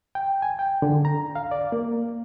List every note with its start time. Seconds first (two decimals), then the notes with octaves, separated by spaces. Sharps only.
0.15 G5
0.42 G#5
0.59 G5
0.82 D3
1.05 A#5
1.35 F5
1.51 D5
1.72 A#3